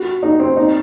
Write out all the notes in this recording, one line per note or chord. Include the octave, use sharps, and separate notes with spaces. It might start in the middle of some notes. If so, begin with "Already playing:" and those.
Already playing: F#4
D#4
C4
D#4